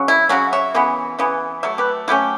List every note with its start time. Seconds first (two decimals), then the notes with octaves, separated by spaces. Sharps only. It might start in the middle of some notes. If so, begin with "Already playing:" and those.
Already playing: C#3 F#3 C#4
0.08 E4
0.29 C#3 F#3 C#4 F#4
0.53 C#5 E5
0.75 C#3 E3 B3
1.19 C#3 E3 B3
1.63 F#3 A3 E5
1.78 G4 B4
2.08 F#3 A3 C#4 E4 G4